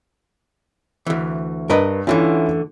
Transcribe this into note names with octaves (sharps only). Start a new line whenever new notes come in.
D2 E3
G2 A#4 B4 D#5
D2 D3 E3 C#4 E4 F4